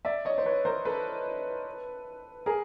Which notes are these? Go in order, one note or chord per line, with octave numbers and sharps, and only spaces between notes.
D5 E5
C#5 D#5
C5
B4 C#5
A#4 C5
A4 B4
G#4 A#4